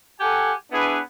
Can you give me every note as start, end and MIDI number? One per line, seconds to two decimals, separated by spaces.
0.20 0.52 67
0.20 0.52 69
0.20 0.52 78
0.20 0.52 80
0.72 0.98 59
0.72 0.98 62
0.72 0.98 64
0.72 0.98 68
0.72 0.98 71